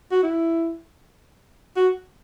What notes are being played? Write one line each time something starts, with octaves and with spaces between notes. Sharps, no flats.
F#4
E4
F#4